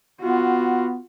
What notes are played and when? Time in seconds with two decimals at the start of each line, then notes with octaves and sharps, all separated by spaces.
0.21 B3 F4 F#4